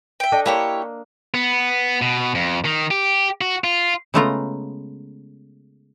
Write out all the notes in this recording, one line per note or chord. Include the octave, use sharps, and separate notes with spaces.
E5 G5
D4 A4 D#5
A#3 E4 G4 C#5
B3
B2
F2
D#3
G4
F#4
F4
C#3 G#3 A3 B3 F4 A#5